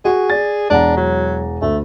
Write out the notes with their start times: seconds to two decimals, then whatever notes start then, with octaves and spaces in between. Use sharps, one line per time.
0.05 F#4 G#4
0.30 D5 A6
0.70 E1 D4 F#5 A#5
0.97 F#3
1.62 D2 A3